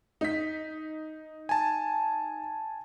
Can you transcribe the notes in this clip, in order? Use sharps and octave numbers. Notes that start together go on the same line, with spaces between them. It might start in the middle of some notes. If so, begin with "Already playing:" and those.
D#4 B6
G#5 A5